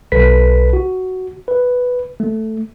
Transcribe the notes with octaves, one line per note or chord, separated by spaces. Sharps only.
B1 A4 B4 B6
F#4
B4
A3